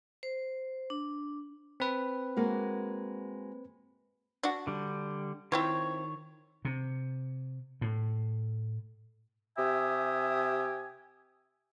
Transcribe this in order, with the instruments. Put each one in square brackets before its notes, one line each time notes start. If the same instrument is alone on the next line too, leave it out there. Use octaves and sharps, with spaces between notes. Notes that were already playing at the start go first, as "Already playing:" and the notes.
[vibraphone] C5
D4
[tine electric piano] C4 B4
[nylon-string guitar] G#3 A#3 F#4
[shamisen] D4 F#4
[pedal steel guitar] D3 G3
[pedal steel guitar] D#3 C#5 [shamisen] F3 C4 E4
[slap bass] C3
A2
[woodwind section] C3 G4 E5 G#5 D#6